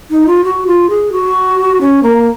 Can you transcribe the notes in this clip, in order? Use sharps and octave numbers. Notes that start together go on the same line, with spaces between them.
D#4
F4
F#4
F4
G#4
F#4
C#4
A#3